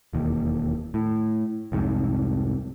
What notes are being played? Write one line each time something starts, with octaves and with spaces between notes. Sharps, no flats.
E1 D#2
A2
C2 F2 G#2